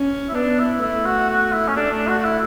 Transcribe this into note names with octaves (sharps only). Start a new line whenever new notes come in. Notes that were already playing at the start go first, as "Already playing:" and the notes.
Already playing: C#4
E4
B3 D4
E4
A3 E4
F#4
F#4
E4
C#4
A3 D4
D4
F#4
F#4
E4